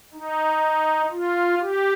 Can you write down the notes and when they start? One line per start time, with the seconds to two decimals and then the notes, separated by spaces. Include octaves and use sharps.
0.13 D#4
1.11 F4
1.60 G4